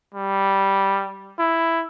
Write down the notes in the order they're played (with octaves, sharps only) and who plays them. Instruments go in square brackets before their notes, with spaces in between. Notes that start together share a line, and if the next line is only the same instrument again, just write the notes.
[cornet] G3
E4